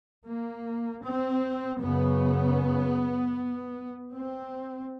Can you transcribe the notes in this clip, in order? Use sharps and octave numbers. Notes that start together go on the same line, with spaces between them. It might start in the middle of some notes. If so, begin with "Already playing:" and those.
A#3
C4
F#2 C#3 B3
C4